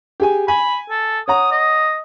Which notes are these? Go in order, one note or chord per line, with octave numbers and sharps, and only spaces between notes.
G4 G#4 G#5
G#5 B5
A4
C#5 F#5 A#5 D#6
D#5